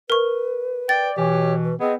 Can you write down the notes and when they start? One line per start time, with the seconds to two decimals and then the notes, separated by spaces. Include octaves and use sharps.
0.10 A#4 B4 C#6
0.89 D5 G5 A6
1.17 B2 E3 G4 C#5
1.64 B4
1.80 B3 C4 G#4 D#5